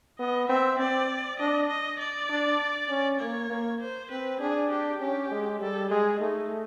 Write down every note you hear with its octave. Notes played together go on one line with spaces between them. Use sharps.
B3 D#5
C4 E5
C4 D5
D4 D#5
D#5
D5
D4
C#4
A#3 C#5
A#3
C5
C4 B4
D4 G#4
G4
C#4 G4
G#3
G3 A4
G#3 G#4
A3 D#4